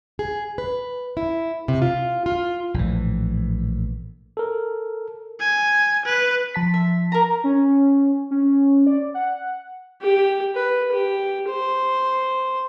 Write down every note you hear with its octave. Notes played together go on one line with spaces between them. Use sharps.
G#4
B4
E4
C3
F4
F4
A#1 A2 D#3 E3
A4 A#4
G#5
B4
F3 A5 B6
E5
A#4 A#5
C#4
C#4
D5
F#5
G4
B4
G4
C5